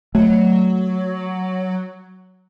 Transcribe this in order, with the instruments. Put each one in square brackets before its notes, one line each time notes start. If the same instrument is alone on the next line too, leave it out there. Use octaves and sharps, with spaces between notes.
[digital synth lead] F#3 [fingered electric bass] A3